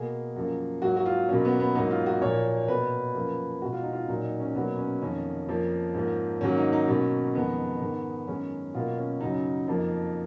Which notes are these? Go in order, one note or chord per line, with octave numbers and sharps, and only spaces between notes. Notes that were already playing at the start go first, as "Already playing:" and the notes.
Already playing: B2 A#3 G#4
F#2 F3 A#3
G#2 F#3 A#3 F#4
F#4
F4
B2 F#3 A#3 C#4
B3
B3
G#2 F#3 A#3 D#4
F4
F#4
A#2 F3 A#3 C#5
B2 A#3 B4
F#2 F3 A#3
B2 G#3 F#4
F4
D#4
F4
A#2 F#3 A#3 D#4
D#4
C#4
B2 F#3 A#3 B3
C#4
F2 D#3 A#3 C#4
F2 F3 A#3
G#2 F3 A#3
G#2 D#3 F#3 A#3 C#4
D#4
D#4
B2 F#3 A#3 C#4
F2 D#3 G#3 B3
G#2 D#3 G#3
F#2 D#3 G#3 C#4
B2 F#3 A#3 F4
C#4
F#2 C#3 F#3 D#4
F2 F3 A#3